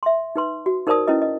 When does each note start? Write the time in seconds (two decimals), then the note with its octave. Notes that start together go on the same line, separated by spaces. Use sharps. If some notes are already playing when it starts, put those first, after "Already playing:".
0.03 E5 C6
0.36 D#4 B4 C6
0.66 F#4
0.87 D#4 A#4 C5 D5 A5 D#6
1.08 C#4 E4 B4 D#5
1.22 D#5